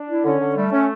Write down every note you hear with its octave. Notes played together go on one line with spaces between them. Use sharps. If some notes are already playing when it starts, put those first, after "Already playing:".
Already playing: D4
E4
D3 C#4
D3
G3 A3
C#4